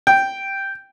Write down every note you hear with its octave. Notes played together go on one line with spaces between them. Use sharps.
G5